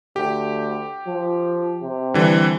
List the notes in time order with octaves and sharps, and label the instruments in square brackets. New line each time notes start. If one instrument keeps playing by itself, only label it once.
[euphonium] D2 [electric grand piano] G4
[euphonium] F3
C3
[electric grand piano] D3 E3 G3